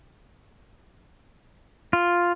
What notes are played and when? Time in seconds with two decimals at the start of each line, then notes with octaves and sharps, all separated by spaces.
1.93 F4